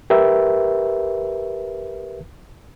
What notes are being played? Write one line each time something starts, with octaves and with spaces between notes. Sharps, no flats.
G4 A#4 B4 E5